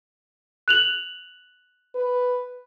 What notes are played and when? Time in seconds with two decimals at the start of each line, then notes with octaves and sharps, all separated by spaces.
0.68 F#6 F7 F#7
1.95 B4